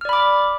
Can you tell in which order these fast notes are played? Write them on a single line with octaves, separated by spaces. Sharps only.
F6 D5 B5 D6